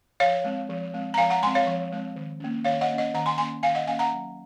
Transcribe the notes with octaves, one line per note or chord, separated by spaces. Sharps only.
F3 C#5 F5
G#3 C4
F3
G#3 C4
A#5
F3 F5 G#5
F#5 A#5
G#3 C4 G#5 C6
C#5 F5
F3
G#3 C4
D#3
A#3 C#4
D#3 C#5 F5
D#5 F#5
A#3 C#4
D#5 F#5
D#3 F#5 A#5
G#5 C6
A#3 C#4 G#5 C6
D#3 F5 G#5
D#5 F#5
A#3 C#4 F5 G#5
F#5 A#5
F#3